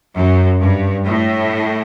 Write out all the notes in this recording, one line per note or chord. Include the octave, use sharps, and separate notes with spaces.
F#2
G2
A2